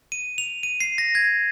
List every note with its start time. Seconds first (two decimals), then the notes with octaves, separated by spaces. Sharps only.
0.12 D#7
0.38 F7
0.63 D#7
0.81 C7
0.98 A#6
1.15 G#6